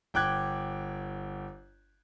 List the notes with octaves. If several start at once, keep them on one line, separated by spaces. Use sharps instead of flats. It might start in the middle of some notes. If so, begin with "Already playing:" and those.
G1 G5 D6 F#6 G#6